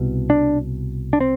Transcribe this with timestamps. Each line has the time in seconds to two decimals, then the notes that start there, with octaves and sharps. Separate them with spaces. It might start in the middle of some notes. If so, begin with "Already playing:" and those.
Already playing: C2 B2
0.30 D4
1.13 D4
1.20 C4